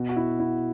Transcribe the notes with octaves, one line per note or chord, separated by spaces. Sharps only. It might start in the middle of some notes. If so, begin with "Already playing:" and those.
Already playing: B2
F#4
E4
E4